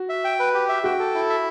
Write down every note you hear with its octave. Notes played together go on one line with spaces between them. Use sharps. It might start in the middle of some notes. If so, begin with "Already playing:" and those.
Already playing: F#4
E5
G5
B4
G4
E5
F#4 G5
A4
E4
E5